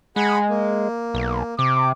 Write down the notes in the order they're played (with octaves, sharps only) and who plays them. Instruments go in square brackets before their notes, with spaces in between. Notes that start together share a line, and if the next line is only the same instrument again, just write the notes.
[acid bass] G#3 [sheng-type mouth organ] G#4 F#5 B5
[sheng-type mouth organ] A#3
[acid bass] B1
[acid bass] C3 [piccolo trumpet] D6